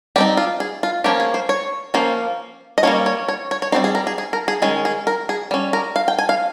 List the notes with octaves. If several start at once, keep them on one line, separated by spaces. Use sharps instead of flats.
G3 C4 D#4 G4
F4
G#4
F4
F3 A#3 C#4 G4
G#4
C5
C#5
F3 A#3 C#4 C5
D#5
G3 A#3 C#4 C#5
C#5
C#5
C#5
C#5
G3 C4 D#4 C5
G#4
A#4
G#4
G#4
A#4
G#4
D#3 G#3 C#4 G#4
G#4
A#4
G#4
G3 C#4
A#4
F5
G5
G#5
F5